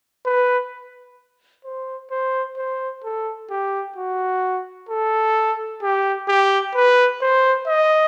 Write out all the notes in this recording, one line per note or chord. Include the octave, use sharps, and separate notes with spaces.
B4
C5
C5
C5
A4
G4
F#4
A4
G4
G4
B4
C5
D#5